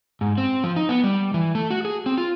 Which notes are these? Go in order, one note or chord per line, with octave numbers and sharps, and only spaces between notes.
G#2
C4
F3
D#4
B3
G3
E3
A3
F#4
G#4
C4
F4